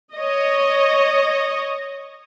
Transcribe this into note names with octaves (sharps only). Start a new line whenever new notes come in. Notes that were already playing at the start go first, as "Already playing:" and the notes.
C#5 D#5